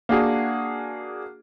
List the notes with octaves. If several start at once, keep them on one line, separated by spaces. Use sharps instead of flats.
A#3 D4 F#4 G#4